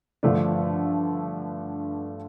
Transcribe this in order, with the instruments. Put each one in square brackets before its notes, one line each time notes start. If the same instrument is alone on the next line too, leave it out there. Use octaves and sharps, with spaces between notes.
[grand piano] G2 D3 F3 A3 D4